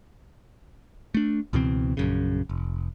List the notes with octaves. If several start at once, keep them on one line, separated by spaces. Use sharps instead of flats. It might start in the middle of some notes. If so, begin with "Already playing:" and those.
A3 D4
C#2 B2 E3 C4
A#1 F#2 C#3
F1